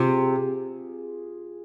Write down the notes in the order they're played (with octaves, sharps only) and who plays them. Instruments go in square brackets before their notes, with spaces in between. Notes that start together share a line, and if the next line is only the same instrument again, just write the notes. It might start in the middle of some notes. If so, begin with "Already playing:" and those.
Already playing: [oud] C3 [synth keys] F4 G#4